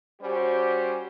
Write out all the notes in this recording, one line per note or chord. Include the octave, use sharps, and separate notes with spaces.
G3 C#4 F#4 G4 C5